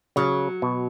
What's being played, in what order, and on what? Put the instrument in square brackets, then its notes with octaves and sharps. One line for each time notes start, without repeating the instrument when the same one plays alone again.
[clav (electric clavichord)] C#3 [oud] F#3
[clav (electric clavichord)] B2